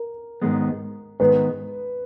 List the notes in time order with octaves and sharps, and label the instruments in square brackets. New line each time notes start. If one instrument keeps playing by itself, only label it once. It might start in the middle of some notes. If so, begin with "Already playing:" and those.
Already playing: [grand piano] A#4
[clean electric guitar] G#2 D#3 G#3 B3
[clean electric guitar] G#2 D#3 G#3 B3 [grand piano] B4